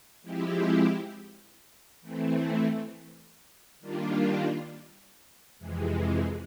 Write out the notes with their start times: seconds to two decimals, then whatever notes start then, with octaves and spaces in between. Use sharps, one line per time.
0.22 F3 G#3 C4 E4 G4
2.01 E3 A3 C4
3.80 D#3 G3 A#3 D4 F4
5.59 F2 C3 E3 G#3